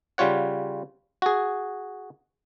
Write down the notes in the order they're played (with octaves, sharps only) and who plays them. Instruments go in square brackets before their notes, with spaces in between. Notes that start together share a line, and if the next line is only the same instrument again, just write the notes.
[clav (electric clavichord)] C#3 G3 F4 C#5 F#5
F#4 G#4